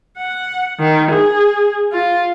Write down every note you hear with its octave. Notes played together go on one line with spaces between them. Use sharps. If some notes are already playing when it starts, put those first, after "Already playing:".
F#5
D#3
G#4
F4